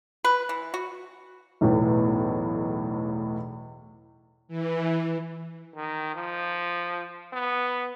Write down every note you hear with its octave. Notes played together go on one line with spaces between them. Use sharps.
B4
E3
F#4
B1 E2 A2
E3
D#3
F3
B3